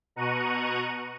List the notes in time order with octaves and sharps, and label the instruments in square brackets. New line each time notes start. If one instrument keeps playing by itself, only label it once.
[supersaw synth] B2 A#5 C#6 F#6 D#7